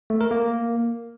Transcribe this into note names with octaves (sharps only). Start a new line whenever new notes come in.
A3
A#4
A#3